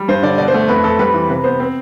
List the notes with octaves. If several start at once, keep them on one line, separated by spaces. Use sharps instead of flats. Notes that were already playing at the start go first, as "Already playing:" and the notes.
Already playing: G3
G2 C5
D3 D5
B2 D5
C5
A3
F2 B4
F2 A4
G3 B4
E3
C3 B4
B3 C5
C4